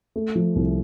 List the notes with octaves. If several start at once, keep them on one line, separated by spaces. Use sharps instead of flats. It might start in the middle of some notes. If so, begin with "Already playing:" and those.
A3
F3
C2